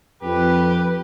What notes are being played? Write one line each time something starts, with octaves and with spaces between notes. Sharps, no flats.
F2 G4 B4